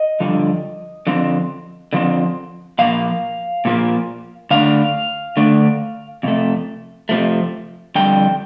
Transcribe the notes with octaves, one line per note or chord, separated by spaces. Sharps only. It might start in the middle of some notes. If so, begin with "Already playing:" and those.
Already playing: D#5
G2 D3 F3
D3 F3 C4
D3 F3 C4
A#2 F3 A#3 F5
A#2 F3 A#3
D3 A3 D4 F5
D3 A3 D4
F2 C3 A3
F2 C3 F3 A3
F2 D3 G3 G5